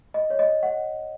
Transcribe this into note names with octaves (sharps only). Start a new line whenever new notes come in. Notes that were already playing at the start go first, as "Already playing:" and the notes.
D#5
C#5
D#5
F#5